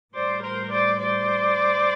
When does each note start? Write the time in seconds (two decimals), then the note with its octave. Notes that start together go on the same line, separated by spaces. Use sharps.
0.14 A2 E3 G3 C5 D5
0.42 A#4 C5
0.70 C5 D5
0.99 C5 D5